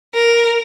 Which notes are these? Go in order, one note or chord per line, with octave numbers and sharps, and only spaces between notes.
A#4